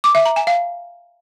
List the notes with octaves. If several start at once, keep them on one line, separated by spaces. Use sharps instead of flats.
D6
E5
A#5
G#5
F5